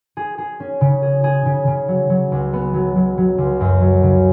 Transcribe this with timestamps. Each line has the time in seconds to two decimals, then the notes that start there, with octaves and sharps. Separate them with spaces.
0.17 G#4
0.38 G#4
0.60 C#4
0.81 C#3
1.02 G#4
1.24 G#4
1.46 C#3
1.67 C#3
1.88 F#3
2.10 F#3
2.32 C#2
2.53 B3
2.74 F#3
2.96 F#3
3.18 F#3
3.38 C#2
3.60 F#2
3.81 F#3
4.03 C#3